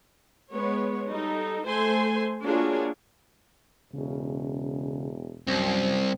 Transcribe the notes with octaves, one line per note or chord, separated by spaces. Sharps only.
G#3 B3 C#5
G3 D#4 A4
A3 A4 C5 G#5 C6
A#3 D4 F4 F#4 G#4 C#5
E1 C#3
C2 F#2 C4